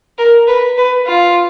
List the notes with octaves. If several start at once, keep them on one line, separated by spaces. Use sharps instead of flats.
A#4
B4
B4
F4